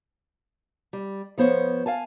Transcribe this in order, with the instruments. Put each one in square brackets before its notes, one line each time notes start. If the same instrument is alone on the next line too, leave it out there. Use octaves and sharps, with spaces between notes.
[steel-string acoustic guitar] G3
F3 B3 C5 C#5
F5 G#5 A5